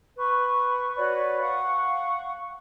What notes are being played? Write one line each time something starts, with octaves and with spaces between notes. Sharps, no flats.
B4 C#6
F#4 B4 C#5 D5
F5 F#5 C#6